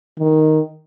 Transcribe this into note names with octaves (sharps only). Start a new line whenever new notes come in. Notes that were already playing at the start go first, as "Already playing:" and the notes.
D#3